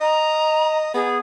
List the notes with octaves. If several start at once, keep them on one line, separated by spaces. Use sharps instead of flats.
D#5 A#5
B3 G#4